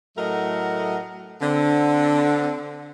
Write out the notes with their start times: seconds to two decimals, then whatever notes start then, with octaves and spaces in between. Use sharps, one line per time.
0.17 A2 F#3 A3 A#4 D#5 F#5
1.42 D3 C4